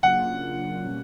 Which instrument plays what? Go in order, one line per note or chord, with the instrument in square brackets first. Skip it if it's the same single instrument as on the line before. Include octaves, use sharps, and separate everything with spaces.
[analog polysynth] C#3 F#3 A#3 D4 F4 [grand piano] F#5
[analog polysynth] B2 G3 A#3 C#4